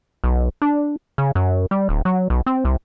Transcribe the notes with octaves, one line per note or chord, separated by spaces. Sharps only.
B1
D4
C#3
F#2
G3
D1
F#3
B1
C4
C2